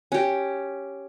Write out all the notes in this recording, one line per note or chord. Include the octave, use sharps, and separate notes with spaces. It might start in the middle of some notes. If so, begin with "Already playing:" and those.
C#4 G4